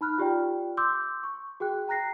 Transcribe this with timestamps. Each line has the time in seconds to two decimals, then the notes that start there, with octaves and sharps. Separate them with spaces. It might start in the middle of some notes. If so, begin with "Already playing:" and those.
0.01 D#4 B5 F6 F#6
0.18 F4 G4 D5 G5
0.77 C6 D6 E6 G6
1.23 C#6
1.60 F#4 G#4 G5 F#6
1.88 G5 A#5 F#6 A#6 C7